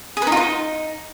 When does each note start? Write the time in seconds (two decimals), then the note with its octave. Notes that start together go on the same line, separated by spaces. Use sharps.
0.17 G#4
0.22 B4
0.27 D#4
0.32 F4
0.37 D#4